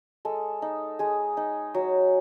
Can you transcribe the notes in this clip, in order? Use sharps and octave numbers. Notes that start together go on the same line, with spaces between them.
G#3 A4
D#4
G#3 G#4
D#4
F#3